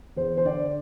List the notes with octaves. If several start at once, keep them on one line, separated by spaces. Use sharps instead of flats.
E2 C5
C5
D3 D5